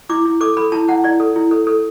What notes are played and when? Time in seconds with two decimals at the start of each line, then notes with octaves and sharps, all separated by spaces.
0.09 E4 D6
0.25 E4
0.41 A4 D6
0.57 A4 B5
0.72 E4 A5
0.88 E4 F#5
1.04 E4 D5
1.20 A4
1.36 E4
1.51 A4
1.67 A4